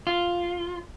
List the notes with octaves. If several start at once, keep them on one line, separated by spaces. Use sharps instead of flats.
F4